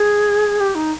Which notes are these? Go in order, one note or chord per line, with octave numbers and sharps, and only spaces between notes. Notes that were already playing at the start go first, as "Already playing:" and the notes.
Already playing: G#4
G4
D#4